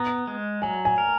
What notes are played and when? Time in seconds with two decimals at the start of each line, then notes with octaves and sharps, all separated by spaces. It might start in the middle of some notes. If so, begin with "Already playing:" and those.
Already playing: B3 A#5
0.27 G#3
0.62 F#3 G#5
0.85 G#5
0.98 A#4